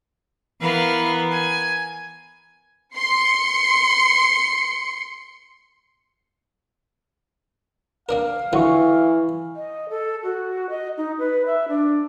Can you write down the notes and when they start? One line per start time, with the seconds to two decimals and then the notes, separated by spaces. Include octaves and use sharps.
0.61 E3 B3 A#4 B4 F5
1.31 G#5
2.95 C6 C#7
8.09 A#3 D4 A#4 F5
8.53 D3 E3 F#3 E4 F4 C#6
9.56 D#5
9.90 A4
10.23 F#4
10.70 D#5
10.97 D#4
11.19 B4
11.46 E5
11.69 D4